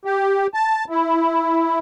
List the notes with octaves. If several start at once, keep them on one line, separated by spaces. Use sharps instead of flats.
G4
A5
E4